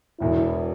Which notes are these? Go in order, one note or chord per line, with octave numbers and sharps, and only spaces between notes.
E1 E2 B2 E4